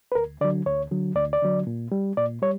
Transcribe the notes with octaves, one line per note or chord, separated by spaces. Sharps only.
B4
D2 A#4
D3 F#3 D5
D2 C#5
D3 F#3
D2 D5
D5
D3 F#3
A#2
G3
A#2 D5
G3 C#5